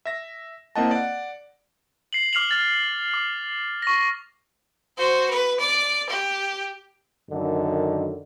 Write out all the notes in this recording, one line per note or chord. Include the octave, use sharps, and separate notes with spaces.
E5 A#6
A#3 C4 E4 D#5 F#5 A5
D5 F#5
C7 F#7
D6 F6 C7 F7 F#7
F6 A6 F#7
D6
C#6 A#6
F#4 C5
B4
D5
G4
F#2 D3 D#3